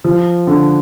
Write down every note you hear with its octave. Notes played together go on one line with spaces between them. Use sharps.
F3
D3